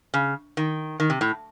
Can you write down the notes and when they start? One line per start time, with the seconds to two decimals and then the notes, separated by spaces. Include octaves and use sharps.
0.14 C#3
0.57 D#3
1.00 D#3
1.10 C3
1.21 A2